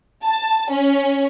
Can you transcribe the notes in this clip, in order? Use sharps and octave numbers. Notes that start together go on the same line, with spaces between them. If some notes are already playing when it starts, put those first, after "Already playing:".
A5
C#4